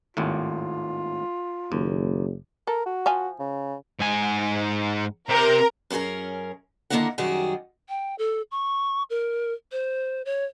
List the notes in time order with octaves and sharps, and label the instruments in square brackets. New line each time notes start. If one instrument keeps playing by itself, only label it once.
[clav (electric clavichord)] G#1 D#2 A2 [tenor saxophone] F4
[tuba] F#1 [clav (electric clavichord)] D#2
[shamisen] A4 [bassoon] A#4
[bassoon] F#4
[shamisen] F3 F5 G#5
[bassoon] C#3
[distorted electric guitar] G#2 G#5
[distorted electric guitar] C3 G4 [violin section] A#4
[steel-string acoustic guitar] F#2 C#4 F#4 G#4 A#4
D3 D#3 A#3 E4 A#4 F#5
F#2 D#3 G3 F#4 G#4
[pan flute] G5
A4
C#6
A#4
C5
C#5